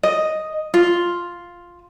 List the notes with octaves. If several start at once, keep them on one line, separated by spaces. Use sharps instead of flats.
D#5
F4